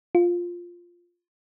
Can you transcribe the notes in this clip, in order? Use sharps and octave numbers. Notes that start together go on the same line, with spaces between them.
F4